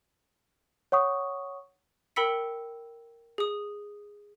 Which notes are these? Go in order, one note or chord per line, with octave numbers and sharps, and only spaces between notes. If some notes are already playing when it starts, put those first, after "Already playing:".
C#5 F#5 C#6 D#6
A#4 G5 B5 E6 B6 C#7
G#4 D#6